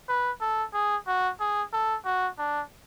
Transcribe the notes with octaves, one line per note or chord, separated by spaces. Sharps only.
B4
A4
G#4
F#4
G#4
A4
F#4
D4